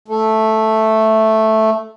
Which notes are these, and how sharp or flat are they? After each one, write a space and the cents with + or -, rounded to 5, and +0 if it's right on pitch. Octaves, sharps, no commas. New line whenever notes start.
A3 +0